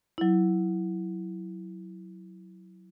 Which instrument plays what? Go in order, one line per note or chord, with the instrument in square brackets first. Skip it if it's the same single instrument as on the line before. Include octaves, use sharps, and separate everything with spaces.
[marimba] F#3 E4